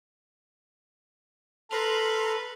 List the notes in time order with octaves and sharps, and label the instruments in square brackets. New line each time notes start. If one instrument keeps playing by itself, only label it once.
[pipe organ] A4 [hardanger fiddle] B4 [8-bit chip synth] A#5 C6 F6